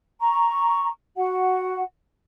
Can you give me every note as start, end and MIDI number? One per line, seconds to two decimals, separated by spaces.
0.21 0.88 82
0.21 0.88 85
1.16 1.82 66
1.16 1.82 78